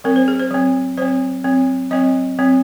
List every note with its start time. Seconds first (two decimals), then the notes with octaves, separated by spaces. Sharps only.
0.04 F#3 C4 A#4
0.16 C5
0.28 G#4
0.40 C5
0.51 F#3 C4
0.98 F#3 C4 C5
1.45 F#3 C4
1.91 F#3 C4 D#5
2.38 F#3 C4